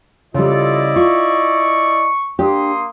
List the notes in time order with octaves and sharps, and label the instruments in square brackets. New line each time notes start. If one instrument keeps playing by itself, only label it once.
[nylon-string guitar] C#3 G3 [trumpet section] E4 D5 D#5 [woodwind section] F4 A4
[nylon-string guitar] F4 [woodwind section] C#6
[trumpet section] A#3 C6 D#6 [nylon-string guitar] D4 G4